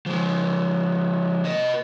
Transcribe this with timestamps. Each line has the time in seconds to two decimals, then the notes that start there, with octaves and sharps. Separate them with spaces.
0.06 F3 G#3
1.45 B4 D#5